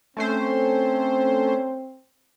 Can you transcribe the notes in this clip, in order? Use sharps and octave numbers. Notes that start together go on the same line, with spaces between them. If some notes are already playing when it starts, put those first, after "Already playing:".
A3 C4 C#4 C5